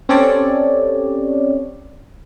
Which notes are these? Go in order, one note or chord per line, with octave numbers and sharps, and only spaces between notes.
C4 C#4 G4 A4 C#5 D5